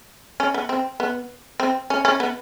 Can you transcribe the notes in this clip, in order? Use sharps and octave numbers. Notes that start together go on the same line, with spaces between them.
C#4
B3
C4
B3
C4
C#4
C#4
B3